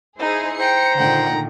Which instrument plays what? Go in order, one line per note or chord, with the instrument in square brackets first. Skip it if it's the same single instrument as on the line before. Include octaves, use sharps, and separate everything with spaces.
[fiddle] D#4 [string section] E4 G#4 C5
[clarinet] C5 [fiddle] G5 [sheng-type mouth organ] A#5 [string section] C#7
[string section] A#2 D3 D#3 [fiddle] F#5 G5